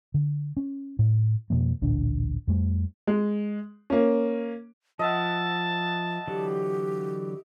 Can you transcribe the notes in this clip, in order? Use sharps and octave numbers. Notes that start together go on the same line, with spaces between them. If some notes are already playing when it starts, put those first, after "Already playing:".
D3
C#4
A2
F2 B2 F3 A#3
A1 D2 A#2 D4
F2 G3 A3
G#3
A#3 C#4
F3 D#5 E5 F#5 A5
D3 E3 F#3 G4